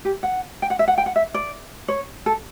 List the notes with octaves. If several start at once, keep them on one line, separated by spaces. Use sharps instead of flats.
G4
F#5
G5
F#5
E5
F#5
G5
F#5
E5
D5
C#5
A4